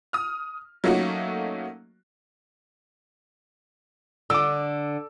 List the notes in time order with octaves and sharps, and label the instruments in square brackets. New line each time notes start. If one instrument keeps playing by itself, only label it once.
[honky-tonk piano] D#6 F6
F#3 A3 A#3 C#4 D#4 F#4
[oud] D3 [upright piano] D6 E6